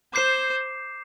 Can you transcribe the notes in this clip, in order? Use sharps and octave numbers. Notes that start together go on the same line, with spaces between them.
C5 D6 G6 C7 E7